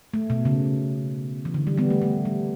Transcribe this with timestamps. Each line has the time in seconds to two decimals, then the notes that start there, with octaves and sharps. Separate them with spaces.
0.14 A3
0.30 B2
0.45 C#3
1.45 E3
1.54 D3
1.67 G3
1.78 G3 B3
1.90 A3
2.02 A3
2.25 G3